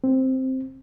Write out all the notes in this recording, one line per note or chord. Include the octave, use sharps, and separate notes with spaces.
C4